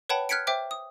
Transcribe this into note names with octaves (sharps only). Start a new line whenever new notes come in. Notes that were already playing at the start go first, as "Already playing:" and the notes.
B4 C#5 F#5 G5 A5 B5
F6 F#6 G#6 B6 C#7 D7
C5 E5 G5 D6
D#6